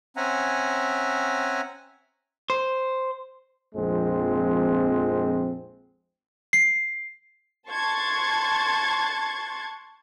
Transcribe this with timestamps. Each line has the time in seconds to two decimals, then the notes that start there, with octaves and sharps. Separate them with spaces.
0.17 C4 C#4 E5 F#5 G#5 A#5
2.50 C5
3.74 A#1 F2 G#3 C4
6.53 C7
7.69 A5 C6 C#6 F#6 G#6 A6